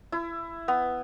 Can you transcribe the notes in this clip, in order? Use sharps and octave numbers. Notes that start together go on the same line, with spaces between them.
E4
B3